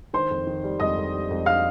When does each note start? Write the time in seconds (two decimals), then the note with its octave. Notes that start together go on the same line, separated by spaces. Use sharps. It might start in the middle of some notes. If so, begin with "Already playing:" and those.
0.13 D#3 C5 C6
0.31 F2
0.47 D#3
0.64 G3
0.80 F2 D#5 D#6
0.97 F2
1.13 G3
1.31 F2
1.46 F5 F6